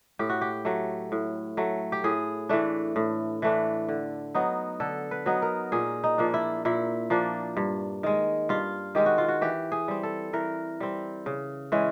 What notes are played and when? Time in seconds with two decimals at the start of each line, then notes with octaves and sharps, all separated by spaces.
0.19 A2 G4
0.30 F#4
0.41 G4
0.65 F#3 A3
1.12 A2
1.57 F#3 A3
1.92 G4
2.04 A2 G#4
2.49 E3 A3 D4
2.96 A2
3.42 E3 A3 D4
3.89 D3
4.35 F#3 B3 D#4
4.80 D3 A4
5.11 B4
5.26 F#3 B3 D#4
5.42 A#4
5.72 A#2 G#4
6.04 D#4
6.18 F3 A#3 D4
6.34 E4
6.65 A#2 E4
7.10 F3 A#3 D4
7.57 G2
8.03 D#3 G#3
8.49 G2 F4
8.95 D#3 G#3 G4
9.06 F#4
9.18 F4
9.28 F#4
9.41 E3 G4
9.72 G#4
9.88 G3 C4
10.03 A4
10.33 E3 A#4
10.80 G3 C4
11.26 C#3
11.72 E3 G#3 C#4